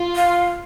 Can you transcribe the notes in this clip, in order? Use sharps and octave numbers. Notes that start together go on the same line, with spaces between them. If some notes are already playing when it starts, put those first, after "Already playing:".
Already playing: F4
F5